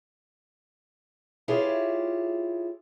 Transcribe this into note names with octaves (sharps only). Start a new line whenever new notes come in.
E4 F4 G4 G#4 C#5